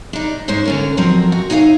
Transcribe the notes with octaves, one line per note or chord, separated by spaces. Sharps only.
D4 D#4
G#2 G#3 C5 C#5
D3 C#4 A#4
F2 F3 F#3 C4 A#4
F#4
D#4 G#4 C#5 D5 F5